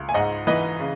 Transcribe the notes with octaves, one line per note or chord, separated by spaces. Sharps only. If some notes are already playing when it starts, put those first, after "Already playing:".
Already playing: C#2
G#5
G#2 D#5 F#5
E3 B4 D#5
C#3